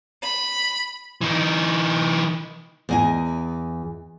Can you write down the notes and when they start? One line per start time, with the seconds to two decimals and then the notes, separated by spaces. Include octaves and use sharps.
0.23 B5
1.21 E3 D#4
2.89 E2 D#5 G#5